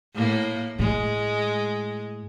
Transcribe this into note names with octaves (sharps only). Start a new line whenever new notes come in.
A2 A#3
A2 G#3